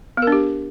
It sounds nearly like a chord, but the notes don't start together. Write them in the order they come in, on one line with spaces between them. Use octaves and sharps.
B3 A#4 D4 G4